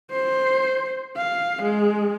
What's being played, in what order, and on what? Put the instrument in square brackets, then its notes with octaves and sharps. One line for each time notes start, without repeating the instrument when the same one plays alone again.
[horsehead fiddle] C5
F5
G#3